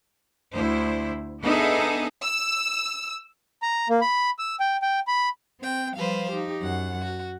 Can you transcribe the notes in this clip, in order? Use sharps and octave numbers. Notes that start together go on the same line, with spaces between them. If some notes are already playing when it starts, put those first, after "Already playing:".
D2 E4 C5
B3 D4 D#4 G#4 A4 E5
E6
A#5
A#3
B5
E6
G5
G5
B5
C4 G5
F3 G3 B4 C5 F5
D#4 G4
F#2 F#5
F#4